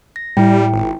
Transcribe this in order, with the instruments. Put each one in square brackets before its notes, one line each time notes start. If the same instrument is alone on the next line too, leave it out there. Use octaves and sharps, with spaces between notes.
[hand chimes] A#6
[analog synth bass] A2 [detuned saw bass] G3 [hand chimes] E4 G5
[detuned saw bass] G#1